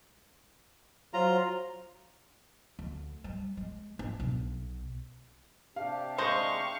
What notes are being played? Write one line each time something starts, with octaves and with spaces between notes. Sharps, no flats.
F#3 F4 C5 A#5
D2
G3
G#3
D4
B1
C3 D4 G4 F5
G#3 C5 D#5 F5 C#6 G6 A#6 E7